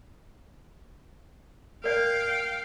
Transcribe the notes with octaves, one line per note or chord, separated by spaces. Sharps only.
A#4 D5 F5 G5